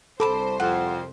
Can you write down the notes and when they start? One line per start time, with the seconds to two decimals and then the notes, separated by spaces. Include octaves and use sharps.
0.20 C2 A4 C5 A5 B5 D6
0.60 F2 F#5